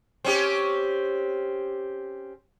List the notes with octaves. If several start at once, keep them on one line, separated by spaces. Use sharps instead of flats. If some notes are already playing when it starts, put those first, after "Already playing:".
C4 C#4 G4